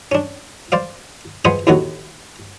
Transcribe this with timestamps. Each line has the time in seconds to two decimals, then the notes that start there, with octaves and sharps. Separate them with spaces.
0.12 C#4 D4
0.72 C5 D5 F5
1.45 F4 G#4 B4 C5 D#5 F#5
1.67 D#2 A2 D#3 D#4 F#4